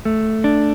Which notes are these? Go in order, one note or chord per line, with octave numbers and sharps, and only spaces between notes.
A3
D4